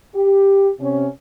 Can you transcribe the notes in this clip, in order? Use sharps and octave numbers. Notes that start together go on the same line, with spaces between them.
G4
C3 C#4